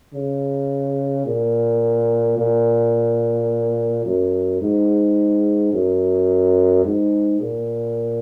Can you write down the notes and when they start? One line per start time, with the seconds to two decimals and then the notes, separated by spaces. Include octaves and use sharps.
0.14 C#3
1.26 A#2
2.38 A#2
4.05 F#2
4.61 G#2
5.73 F#2
6.85 G#2
7.41 A#2